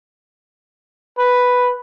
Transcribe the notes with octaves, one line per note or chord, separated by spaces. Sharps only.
B4